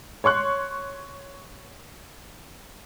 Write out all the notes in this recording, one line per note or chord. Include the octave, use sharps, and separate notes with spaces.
C#5 C6 C#6 F#6